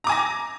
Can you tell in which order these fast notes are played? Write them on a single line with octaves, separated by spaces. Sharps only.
A#5 D6 G#5 A#6